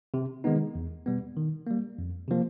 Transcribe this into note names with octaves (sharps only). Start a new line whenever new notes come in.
C3
D#3 G#3 B3 D#4
E2
B2 G3 B3
D#3
G3 A#3
F2
C3 F3 A#3